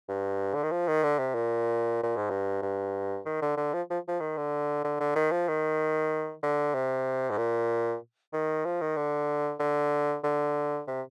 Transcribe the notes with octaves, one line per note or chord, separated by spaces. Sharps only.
G2
D3
D#3
F3
D#3
D3
C3
A#2
A#2
G#2
G2
G2
D#3
D3
D3
F3
F3
F3
D#3
D3
D3
D3
D#3
F3
D#3
D3
C3
G#2
A#2
D#3
F3
D#3
D3
D3
D3
C3